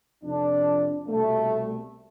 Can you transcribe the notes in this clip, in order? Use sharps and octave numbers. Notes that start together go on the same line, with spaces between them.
F2 C3 F3 D4
C2 B2 G3 A3